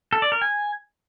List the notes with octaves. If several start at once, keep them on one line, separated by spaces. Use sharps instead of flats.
A4
D5
A#4
G#5